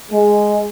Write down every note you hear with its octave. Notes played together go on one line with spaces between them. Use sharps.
G#3